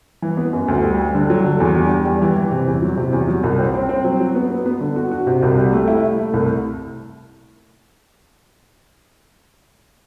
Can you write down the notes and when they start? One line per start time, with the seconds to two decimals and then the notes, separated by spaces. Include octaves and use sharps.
0.22 E3
0.37 B3
0.53 F#2
0.68 D2
0.83 G3
0.99 G3
1.15 D3
1.30 F#3
1.44 D3
1.60 E2
1.75 G3
1.91 E2
2.05 G3
2.22 E3
2.36 E3
2.52 C3
2.67 E2
2.82 F#3
2.97 C3
3.13 E2
3.28 F#3
3.43 C2
3.59 C4
3.74 C4
3.89 C4
4.04 F#3
4.20 F#3
4.35 B3
4.50 B3
4.66 B3
4.81 D3
4.96 F#4
5.12 F#4
5.27 C3
5.42 C2
5.58 G3
5.72 A3
5.88 E4
6.03 E4
6.18 A3
6.34 C2